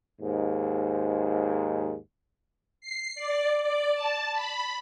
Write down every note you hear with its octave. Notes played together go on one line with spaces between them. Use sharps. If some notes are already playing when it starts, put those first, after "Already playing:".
D#2 G#2
C7
D5
D5
A5
B5